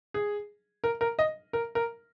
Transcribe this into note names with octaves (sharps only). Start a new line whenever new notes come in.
G#4
A#4
A#4
D#5
A#4
A#4